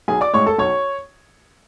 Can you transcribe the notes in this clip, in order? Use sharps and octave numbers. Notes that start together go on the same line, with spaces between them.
B1 G#4 G#5
D5 D6
A2 G#3 C#5 C#6
A4 A5
B1 C#5 C#6